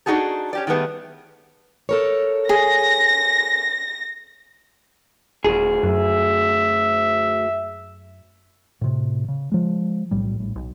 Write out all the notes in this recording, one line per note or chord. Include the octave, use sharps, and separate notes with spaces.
D4 D#4 F#4 G#4 A4
C#4 G4 D5
D#3 G3 A3 B3 G#4
A4 A#4 C#5
G#4 A#6
D#1 D2 G#4
F#2 E5
A2 C3
C#3
F3 G#3
B1 A2 G3
A#1 A2
B1